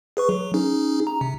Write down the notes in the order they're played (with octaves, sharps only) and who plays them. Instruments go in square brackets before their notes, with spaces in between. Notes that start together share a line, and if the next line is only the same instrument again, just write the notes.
[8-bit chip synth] G#4 B4 C#6
F#3
C#4 D#4 G#4
A#5
C3